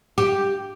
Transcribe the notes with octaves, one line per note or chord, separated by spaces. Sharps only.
G4